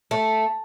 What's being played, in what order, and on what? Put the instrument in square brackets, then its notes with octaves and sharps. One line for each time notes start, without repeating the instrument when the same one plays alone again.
[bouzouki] A3